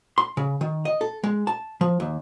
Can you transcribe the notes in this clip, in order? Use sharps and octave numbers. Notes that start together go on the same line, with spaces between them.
C6
C#3
D#3
D#5
A4
G#3
A5
F3
D#2